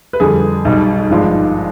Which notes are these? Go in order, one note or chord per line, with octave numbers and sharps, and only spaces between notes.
B4
F2 D3 G3 G#4
B1 B2 G3
G#1 G2 F3 G#3